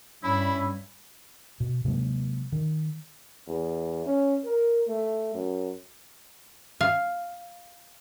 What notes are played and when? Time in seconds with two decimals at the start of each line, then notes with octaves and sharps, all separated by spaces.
0.23 G2 C#4 E4 B5
1.60 B2
1.85 C3 F#3 G#3 A#3
2.52 D#3
3.48 E2
4.06 C#4
4.44 A#4
4.88 A3
5.34 F#2
6.81 F5